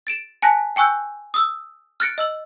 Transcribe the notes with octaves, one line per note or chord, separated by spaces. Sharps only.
A6 D7 E7
G#5 A5 F#6 A#6 B6
G5 G#5 C#6 E6 F#6 G6
D#6 E6
F6 F#6 A6 A#6 C#7 D7
D#5 E6 F#7